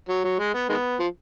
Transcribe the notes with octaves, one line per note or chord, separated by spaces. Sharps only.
F#3
F#3
G#3
B3
D#3 G#3 B3
F3